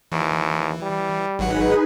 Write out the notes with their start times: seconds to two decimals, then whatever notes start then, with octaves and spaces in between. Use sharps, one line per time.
0.12 D#2 E3
0.82 G3
1.39 G#1 F#3 D#4 G#4 B4 F#5